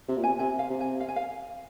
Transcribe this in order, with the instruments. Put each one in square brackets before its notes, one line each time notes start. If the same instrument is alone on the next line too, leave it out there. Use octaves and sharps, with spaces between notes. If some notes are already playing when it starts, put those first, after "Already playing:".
[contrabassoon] C3
A#2
[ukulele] G#5
[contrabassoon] C3
[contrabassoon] C3 [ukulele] G#5
[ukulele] F5
[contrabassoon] C3
[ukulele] G#5
F5
G#5
F5